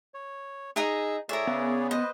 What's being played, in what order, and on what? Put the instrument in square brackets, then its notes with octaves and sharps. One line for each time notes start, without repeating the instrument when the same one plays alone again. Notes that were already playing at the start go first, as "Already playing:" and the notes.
[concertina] C#5
[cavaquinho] D#4 D#5 A#5 [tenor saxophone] G#4 [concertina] E6
[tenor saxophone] A2 [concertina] G#4 C#5 D5 [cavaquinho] A#4 E5
[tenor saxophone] C#3 [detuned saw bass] B3
[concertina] B4 C5 [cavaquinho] D#5